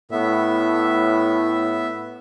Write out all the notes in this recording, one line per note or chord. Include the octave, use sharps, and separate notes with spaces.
A2 B3 E5